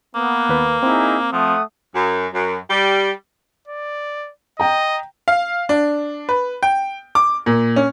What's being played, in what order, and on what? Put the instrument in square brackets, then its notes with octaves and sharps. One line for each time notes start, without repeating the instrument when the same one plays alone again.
[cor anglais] A#3 [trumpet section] B3
[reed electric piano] D#2 B4
[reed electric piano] C4 [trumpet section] D#4 E4 G#4
[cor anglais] F3 [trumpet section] A3 F#5 D#6
[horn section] F#2
F#2
G3
[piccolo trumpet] D5
[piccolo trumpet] D#5 [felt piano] G5 A#5
[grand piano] F5
D4
B4
G5
D6
A#2
C#4